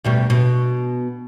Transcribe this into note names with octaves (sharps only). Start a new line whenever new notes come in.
D2 B2 G3
B2